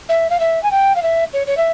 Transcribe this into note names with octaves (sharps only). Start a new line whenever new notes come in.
E5
F5
E5
G#5
G5
F5
E5
C#5
C#5
E5